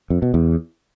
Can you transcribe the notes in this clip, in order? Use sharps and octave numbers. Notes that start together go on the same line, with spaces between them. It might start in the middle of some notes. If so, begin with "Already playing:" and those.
F2
B2
E2